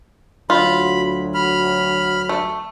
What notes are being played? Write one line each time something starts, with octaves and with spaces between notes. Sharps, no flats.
D2 F#3 F4 B5
B5 F6
A3